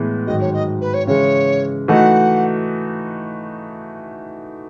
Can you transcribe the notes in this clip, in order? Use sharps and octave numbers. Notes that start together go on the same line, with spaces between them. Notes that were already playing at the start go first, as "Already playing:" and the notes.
Already playing: A2 E3 G#3 B3
G#2 D#3 F#3 D#5
C#5
D#5
B4
C#5
C#3 E3 G#3 C#5
E3 A3 D#4 F#4 F#5